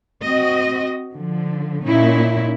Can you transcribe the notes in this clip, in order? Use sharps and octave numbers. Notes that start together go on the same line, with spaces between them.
C4 F#4 D#5
D3 F3
A#2 C#4 D#4 E4